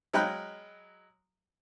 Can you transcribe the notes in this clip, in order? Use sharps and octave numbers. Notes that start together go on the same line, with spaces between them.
F#3 G#3 F5 G5 B5 F#6